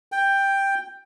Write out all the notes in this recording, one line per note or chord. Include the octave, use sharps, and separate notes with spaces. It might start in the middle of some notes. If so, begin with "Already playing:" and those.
G5